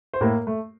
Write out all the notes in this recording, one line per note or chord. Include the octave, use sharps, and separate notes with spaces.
C5
A2 A#3 A#4
A3